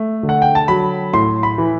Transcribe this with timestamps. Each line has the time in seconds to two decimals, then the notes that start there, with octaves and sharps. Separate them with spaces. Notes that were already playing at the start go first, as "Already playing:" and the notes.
Already playing: A3
0.23 D3
0.29 F#5
0.42 G5
0.55 A5
0.68 F#3 B5
1.14 A2 C6
1.43 B5
1.58 E3